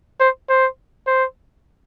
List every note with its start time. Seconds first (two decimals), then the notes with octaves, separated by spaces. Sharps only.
0.20 C5
0.49 C5
1.07 C5